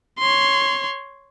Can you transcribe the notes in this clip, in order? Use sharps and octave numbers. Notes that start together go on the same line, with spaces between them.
C#5 C6